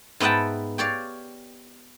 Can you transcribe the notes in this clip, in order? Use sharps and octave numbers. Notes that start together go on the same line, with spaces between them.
G#2 B3 E5 F#5 G5 A5
G4 C#5 D5 F5